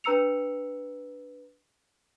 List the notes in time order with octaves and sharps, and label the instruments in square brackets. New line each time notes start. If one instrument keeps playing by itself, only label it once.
[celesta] D4 B4 A#5 E6 C#7 F7